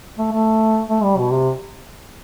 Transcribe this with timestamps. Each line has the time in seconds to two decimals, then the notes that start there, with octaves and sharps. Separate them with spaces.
0.18 A3
0.32 A3
0.89 A3
1.03 G3
1.18 B2
1.32 C3